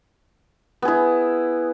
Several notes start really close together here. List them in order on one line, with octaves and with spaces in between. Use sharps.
B3 G#4 E4